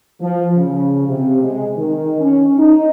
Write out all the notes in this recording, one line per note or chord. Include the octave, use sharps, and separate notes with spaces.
F3
C#3
C3
G#3
D#3
C#4
D#4